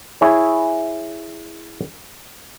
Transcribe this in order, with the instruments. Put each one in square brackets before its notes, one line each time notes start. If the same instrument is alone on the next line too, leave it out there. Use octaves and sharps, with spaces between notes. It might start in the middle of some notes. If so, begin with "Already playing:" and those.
[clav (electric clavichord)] E4 G#4 C#5